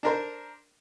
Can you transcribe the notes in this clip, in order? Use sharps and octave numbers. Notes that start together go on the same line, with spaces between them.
D4 A#4 C5